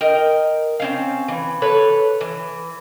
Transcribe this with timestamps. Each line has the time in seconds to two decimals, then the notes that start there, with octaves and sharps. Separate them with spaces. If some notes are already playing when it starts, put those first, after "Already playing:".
0.01 A#4 D#5 G5
0.80 C4 C#4 F5
1.28 E3
1.62 A4 B4 C#5
2.21 E3